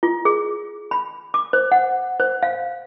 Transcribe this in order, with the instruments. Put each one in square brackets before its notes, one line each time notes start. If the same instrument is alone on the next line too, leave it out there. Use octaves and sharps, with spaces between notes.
[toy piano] F4
G#4
B5
D6
C5
F#5
C5
F5